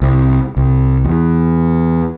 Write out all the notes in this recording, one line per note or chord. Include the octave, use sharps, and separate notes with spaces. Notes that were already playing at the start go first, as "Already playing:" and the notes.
C2
C2
E2